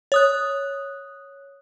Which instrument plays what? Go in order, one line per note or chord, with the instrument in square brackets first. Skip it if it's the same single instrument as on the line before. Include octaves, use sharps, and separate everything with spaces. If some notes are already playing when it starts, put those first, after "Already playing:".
[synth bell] C#5 D#6 F#6